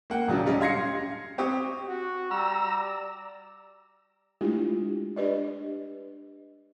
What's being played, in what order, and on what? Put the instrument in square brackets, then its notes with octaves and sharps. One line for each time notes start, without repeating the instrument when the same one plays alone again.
[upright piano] A#3 F#5 G5
D#1 C#3 F#3 D4
G3 C#4 D4 D#5
F5 C6 G#6 A#6 C7 C#7
C4 G4 C#6 D#6
[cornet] F#4
[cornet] G3 [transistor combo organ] A#5 E6
[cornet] D5
[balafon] G#3 A3 D4 E4 F4 G4
D4 G4 B4 D5 D#5